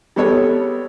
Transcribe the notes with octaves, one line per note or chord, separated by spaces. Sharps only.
G3 G#3 B3 A4 C#5